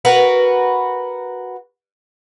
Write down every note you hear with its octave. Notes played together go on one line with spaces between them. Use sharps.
F#4 A#4 B4